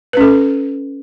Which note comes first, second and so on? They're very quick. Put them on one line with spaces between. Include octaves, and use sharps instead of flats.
B4 C#4 A4